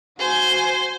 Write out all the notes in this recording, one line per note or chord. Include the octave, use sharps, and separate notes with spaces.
F#4 C5 G#5